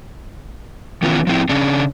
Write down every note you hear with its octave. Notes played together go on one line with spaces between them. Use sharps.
D#3 E3 B3 C#4 F4
F3 C4 E4
C#3 C#4 D4